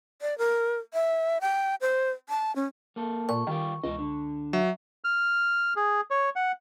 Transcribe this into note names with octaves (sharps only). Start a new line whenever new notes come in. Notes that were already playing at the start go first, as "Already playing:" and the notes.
D5
A#4
E5
G5
C5
A5
C#4
A#3 A4
A#2 C#6
D#3 G3 F4 G4
C#2 B2 E3 D#5
D3
F#3 E5
F6
G#4
C#5
F#5